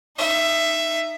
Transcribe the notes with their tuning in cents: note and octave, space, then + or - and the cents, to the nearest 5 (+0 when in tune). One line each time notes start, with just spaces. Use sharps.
D#4 -5 E5 +15